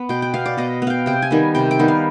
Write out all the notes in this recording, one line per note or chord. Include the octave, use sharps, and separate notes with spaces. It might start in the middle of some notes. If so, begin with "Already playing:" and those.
Already playing: B3
B2 G5
G5
B3 F5
D5
B2 D#5
B3
F5 G5
C3 G5
G#5
D#3 G3 B3
C3 G5
G5
D#3 G3 B3
F5